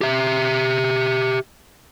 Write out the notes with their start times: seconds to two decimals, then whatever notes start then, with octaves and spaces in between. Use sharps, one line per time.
0.01 G4 E5